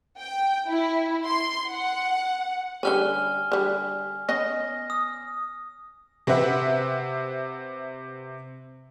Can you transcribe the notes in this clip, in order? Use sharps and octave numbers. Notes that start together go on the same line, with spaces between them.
G5
E4
C6
F#5
D3 G3 C#4 G#5 F6 G7
D3 G3
B3 C#4 D#5 A#6
D#6
C3 C4 B4 E5 F#5